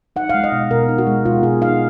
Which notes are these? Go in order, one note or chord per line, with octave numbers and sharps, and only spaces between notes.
D#4 F#5
F5
G#3
D#5
B2
B2 A#4
D#4
F#4
G#3
B2 F4
B2 G#4
D#4 F5